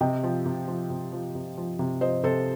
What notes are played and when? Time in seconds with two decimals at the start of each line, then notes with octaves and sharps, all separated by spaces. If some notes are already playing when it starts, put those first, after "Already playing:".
0.01 C3 D#5 G5
0.23 F3
0.46 C3
0.68 F3
0.90 C3
1.13 F3
1.35 C3
1.58 F3
1.79 C3
2.01 F3 C5 D#5
2.23 C3 A4 C5